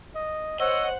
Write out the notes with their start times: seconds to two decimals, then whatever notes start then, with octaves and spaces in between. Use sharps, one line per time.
0.15 D#5
0.60 C5 C#5 D#5 F#5 E6